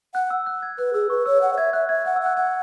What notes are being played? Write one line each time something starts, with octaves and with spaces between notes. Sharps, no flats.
F#5 F#6
E6
F#6
G#6
B4 F#6
G#4 E6
B4 C#6
C#5 E6
F#5 F#6
C#5
E5 G#6
E5 F#6
E5 G#6
F#5 F#6
E6
F#5 F#6
F#5 G#6